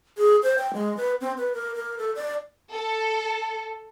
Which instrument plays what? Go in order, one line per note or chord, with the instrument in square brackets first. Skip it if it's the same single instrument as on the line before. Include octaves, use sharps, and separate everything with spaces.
[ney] G#4
C5
G5
G#3
B4
C4
B4
A#4
A#4
A4
D5
[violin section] A4